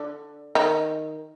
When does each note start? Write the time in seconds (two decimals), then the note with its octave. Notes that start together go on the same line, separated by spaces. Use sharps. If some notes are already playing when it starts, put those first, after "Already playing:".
Already playing: D3
0.55 D#3